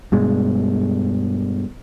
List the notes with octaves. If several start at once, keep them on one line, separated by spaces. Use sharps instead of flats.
G2 B2 G#3